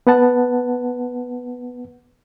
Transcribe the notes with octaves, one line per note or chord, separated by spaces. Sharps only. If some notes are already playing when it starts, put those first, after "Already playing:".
B3 B4 F#5 A5